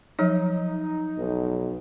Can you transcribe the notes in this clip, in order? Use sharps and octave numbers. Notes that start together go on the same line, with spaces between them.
F3 F#3 D#4 C#5
B1